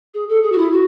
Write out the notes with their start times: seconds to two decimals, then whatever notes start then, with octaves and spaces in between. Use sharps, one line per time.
0.14 G#4
0.28 A4
0.43 G#4
0.52 F#4
0.57 E4
0.72 F#4